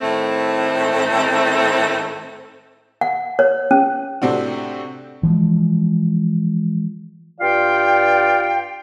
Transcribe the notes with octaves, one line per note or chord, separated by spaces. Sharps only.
A2 D#3 A3 C4
F#5
C#5
C#4
A2 C3 C4 D4 F#4
E3 F3 G#3
G2 F4 D5 F5 G5